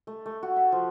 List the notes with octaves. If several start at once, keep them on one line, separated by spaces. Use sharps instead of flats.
A3
A3
F#4
E5
F3